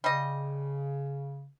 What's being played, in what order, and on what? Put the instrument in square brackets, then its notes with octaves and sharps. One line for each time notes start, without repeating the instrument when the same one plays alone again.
[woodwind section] C#3 [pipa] G3 D#5